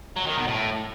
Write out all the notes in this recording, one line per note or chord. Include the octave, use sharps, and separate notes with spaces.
F#3
D#3
B2
A2